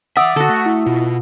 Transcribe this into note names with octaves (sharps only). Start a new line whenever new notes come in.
E3 D5 E5 F#5 D#6 E6
D3 F#4 A4
A3
E4
B2 F4